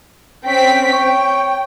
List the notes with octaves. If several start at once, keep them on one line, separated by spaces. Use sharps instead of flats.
C4 C#4 G5 B6
C#5 G5